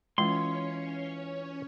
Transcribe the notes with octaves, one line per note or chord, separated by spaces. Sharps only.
E3 G#3 C#4 F4 C#5 D#5 C6